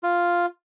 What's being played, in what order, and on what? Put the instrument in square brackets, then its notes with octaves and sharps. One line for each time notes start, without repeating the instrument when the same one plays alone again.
[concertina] F4